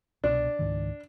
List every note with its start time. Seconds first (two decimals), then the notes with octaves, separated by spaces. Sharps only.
0.24 C2 B2 D4
0.59 C#2 G#2 D#3